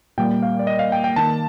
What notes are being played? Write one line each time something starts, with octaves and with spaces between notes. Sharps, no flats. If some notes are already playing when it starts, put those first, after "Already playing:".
A#2 G3 A#3 G5
F5
D5
D#5
F5
G5
G5
D#3 A#3 A5